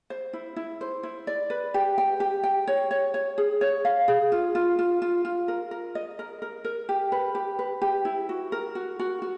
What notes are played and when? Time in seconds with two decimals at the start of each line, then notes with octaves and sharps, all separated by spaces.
0.10 C5
0.33 E4
0.56 E4
0.81 C5
1.03 E4
1.27 D5
1.50 B4
1.74 G4
1.98 G5
2.20 G4
2.44 G5
2.68 C#5
2.91 C#5
3.14 C#5
3.38 G#4
3.61 C#5
3.85 F5
4.08 G#4
4.32 F4
4.55 F4
4.79 F4
5.02 F4
5.25 F4
5.48 A#4
5.71 A#4
5.95 D#5
6.19 A#4
6.42 A#4
6.65 A#4
6.89 G4
7.12 B4
7.35 G4
7.59 B4
7.82 G4
8.05 E4
8.29 F#4
8.52 A#4
8.75 F#4
9.00 F#4
9.22 F#4